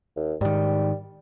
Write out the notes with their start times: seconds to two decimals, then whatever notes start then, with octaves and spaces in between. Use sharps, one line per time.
0.16 D#2
0.41 G#2 D#3 G3